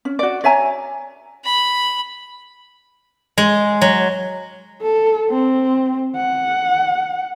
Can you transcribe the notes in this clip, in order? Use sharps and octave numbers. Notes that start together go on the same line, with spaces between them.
C#4
F#4 D5
C#5 E5 G#5 A#5
B5
G#3
F#3
A4
C4
F#5